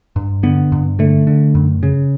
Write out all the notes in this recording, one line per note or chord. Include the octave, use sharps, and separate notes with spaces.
G2
D3 B3
G2
D3 A3
D3
F#2
C#3